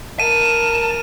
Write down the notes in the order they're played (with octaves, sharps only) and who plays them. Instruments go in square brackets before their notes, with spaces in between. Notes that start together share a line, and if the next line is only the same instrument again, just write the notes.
[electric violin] A#4 [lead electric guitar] A5 [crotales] D#7